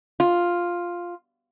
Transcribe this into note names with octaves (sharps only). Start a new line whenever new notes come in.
F4